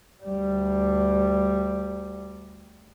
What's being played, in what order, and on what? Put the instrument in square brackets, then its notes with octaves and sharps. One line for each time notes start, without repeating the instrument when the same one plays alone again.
[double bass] D2 G3